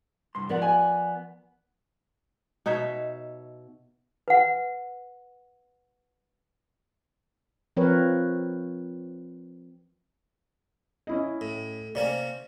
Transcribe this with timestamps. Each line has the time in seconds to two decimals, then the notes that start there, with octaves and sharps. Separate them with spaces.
0.35 C2 G2 C6
0.49 F3 B3 A#4 D5 F#5
0.62 G#5
2.66 B2 D#4 C#5 E5
4.28 B4 F#5
7.77 F3 C4 A#4 B4 C#5
11.07 C#4 E4 D#5
11.41 A2
11.95 C3 A#3 C#4 D5